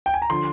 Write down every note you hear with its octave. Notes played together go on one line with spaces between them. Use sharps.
G5
G#5
A#5
D3 F3 C6